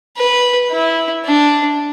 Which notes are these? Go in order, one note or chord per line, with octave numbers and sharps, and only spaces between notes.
B4
E4
D4